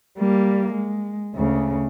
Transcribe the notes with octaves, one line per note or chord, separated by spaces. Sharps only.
G3 A#3
G#3
D2 C#3